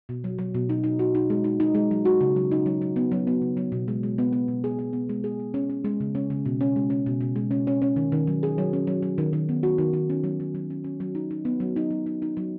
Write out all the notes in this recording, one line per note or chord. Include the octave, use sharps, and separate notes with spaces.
B2
F#3
F#3
B2
D#4
D#4
F#4
D#4
G#3
D#4
D#4
G#3
F#3
F#4
C#3
F#3
D#4
F#3
F#3
B3
F#3
B3
C#3
F#3
B2
G#3
G#3
B3
B3
B2
G#4
G#4
B3
G#3
G#4
B3
C#4
C#4
G#3
C#3
C#4
C#3
B2
C#4
G#3
C#4
B2
B2
G#3
C#4
C#4
C#4
D#3
D#3
F#3
G#4
F#3
C#4
F#3
F#3
D#3
D#3
B3
F#4
D#3
D#3
C#4
F#3
F#3
F#3
C#4
C#4
F#3
D#4
D#4
B3
F#3
D#4
F#3
D#4
D#4
F#3